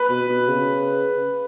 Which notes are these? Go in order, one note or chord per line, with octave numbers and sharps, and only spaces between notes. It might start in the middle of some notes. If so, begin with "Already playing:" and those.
Already playing: B4
B2
B2
C#3